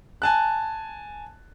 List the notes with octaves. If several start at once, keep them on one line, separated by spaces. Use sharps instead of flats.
G#5 A5 F#6